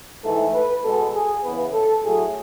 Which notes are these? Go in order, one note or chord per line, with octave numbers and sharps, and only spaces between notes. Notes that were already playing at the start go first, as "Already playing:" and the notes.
G#2 E3 A3 A4
B4
B2 G#3 B3 A4
G#4
C#3 E3 B3 B4
A4
A2 F#3 A3 G#4